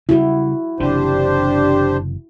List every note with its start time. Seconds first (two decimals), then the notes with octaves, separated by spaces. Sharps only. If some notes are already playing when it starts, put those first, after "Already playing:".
0.09 C#3 G3 E4 F#4
0.80 F#1 C3 E3 D4 G4 C5